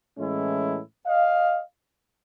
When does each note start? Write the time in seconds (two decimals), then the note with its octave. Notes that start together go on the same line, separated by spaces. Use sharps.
0.18 A2 E3 G#3 C#4 E4
1.07 D#5 F5